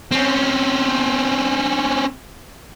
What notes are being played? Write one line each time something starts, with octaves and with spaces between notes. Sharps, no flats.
C4 C#4